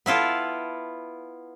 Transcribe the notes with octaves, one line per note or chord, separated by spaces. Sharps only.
B3 E4 F4 A4